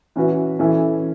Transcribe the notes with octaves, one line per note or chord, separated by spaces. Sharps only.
E3 C#4 F#4 B4 E5
E3 C#4 E4 A4 E5